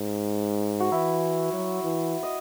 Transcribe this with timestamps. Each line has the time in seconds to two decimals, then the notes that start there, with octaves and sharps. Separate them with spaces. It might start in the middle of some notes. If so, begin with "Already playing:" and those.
Already playing: G#2
0.80 F#4
0.92 E3 E4
1.53 F#3
1.84 E3
2.23 D#5